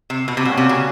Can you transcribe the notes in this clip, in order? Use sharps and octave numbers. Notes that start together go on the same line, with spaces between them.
C3
B2
C3
B2 G3 A#3 C#4 F#4
C3
C#3